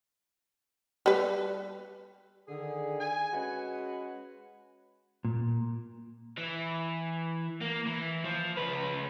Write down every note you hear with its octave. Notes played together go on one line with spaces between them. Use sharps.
G3 B4
D3 D#3 G#4
G#5
G#3 C#4 F#4 B4
A#2
E3
A#3
E3
F3
C#2 B4